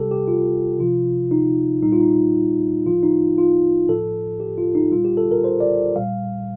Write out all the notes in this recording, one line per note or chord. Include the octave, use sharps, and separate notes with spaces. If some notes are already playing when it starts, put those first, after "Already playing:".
Already playing: C3 G3 G4 A4
G4
F4
C3 F3 F4
D#4
A#2 G3 D#4
F4
D#4
A2 F3 F4
D#4
F4
A2 F3 A4
G4
F4
D#4
A#2 G3 F4
G4
A4
A#4
C5
D5
A#2 G3 F5